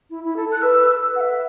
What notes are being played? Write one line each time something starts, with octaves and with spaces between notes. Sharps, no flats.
E4
E4
A4
A4 F#6
B4 E6
F#5
E5